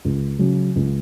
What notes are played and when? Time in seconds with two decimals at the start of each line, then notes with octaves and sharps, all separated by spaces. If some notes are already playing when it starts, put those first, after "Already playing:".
0.05 C#2
0.39 C#3 F#3
0.76 C#2